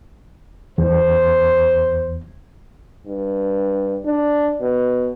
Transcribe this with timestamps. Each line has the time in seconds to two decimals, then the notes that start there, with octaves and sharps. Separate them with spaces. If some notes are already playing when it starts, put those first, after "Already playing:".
0.78 E2 C5
3.06 G2
4.05 D4
4.61 B2